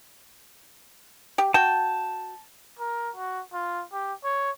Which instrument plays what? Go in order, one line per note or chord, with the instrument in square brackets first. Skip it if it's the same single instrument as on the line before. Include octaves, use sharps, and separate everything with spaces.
[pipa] G4
[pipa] F#4 G5 [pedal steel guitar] A5
[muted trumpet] A#4
F#4
F4
G4
C#5